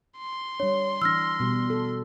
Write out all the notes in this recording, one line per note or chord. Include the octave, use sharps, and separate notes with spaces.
C6
G3 D4 C#5
E3 D4 E6 F6 A#6
B2 G3
A4